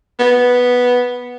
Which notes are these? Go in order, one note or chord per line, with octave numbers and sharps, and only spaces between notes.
B3